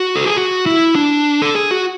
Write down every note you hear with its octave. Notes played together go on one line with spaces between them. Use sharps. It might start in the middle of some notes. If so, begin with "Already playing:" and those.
Already playing: F#4
A4
G#4
F#4
E4
D4
A4
G#4
F#4